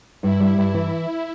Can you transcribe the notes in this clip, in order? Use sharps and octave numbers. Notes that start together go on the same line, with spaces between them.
G2 E4
G3
G2
E3